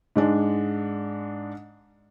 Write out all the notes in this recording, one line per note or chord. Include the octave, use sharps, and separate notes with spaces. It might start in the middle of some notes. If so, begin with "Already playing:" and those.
G#2 G#3 D4